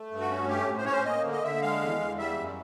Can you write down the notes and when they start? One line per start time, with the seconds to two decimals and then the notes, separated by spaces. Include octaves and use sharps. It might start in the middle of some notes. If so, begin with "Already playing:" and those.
Already playing: A3
0.11 G2
0.21 F#4
0.30 C#4
0.49 A3 G4
0.68 A2
0.77 C5
0.85 C#4 C#5
0.92 C5
1.05 A#3 D#5
1.24 D3
1.32 D#5
1.43 D3 E5
1.62 G#3 F5
1.81 E2
2.00 E2
2.19 G3 E5
2.38 F#2